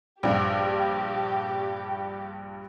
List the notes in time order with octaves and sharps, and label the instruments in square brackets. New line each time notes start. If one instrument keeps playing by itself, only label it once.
[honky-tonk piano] A#1 G2 [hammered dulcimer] G3 [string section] G4